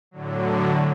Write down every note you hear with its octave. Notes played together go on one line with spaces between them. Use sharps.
A2 D3 F#3